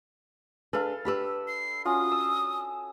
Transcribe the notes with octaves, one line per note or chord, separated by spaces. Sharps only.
D4 G#4 A4 B4 F5
D4 G4 B4 B5 E6
C7
C#4 F4 F#4 D#6
E6